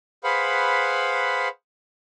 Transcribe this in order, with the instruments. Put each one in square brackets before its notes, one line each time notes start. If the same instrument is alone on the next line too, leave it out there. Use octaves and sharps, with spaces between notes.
[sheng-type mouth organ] G#4 B4 C5 F5 F#5 B5